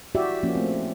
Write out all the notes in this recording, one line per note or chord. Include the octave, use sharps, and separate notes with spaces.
E4 F#4 G4 D5 E5
F3 A#3 C#4
A3 C4